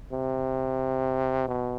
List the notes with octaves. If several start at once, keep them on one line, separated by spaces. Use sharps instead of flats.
C3
B2